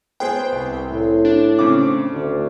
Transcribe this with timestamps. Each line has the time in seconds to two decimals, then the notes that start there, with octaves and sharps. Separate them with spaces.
0.20 B3 G#4 C5 G5
0.53 C2
0.87 A2
1.25 D4
1.59 C#3 C4 D6
2.12 D2